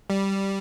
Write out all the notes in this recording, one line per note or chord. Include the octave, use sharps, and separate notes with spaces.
G3